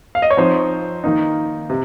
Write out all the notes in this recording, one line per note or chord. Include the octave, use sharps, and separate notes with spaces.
F5
D#5
C#5
F3 C4 D#4 C5
D#3 A#3 D#4
C3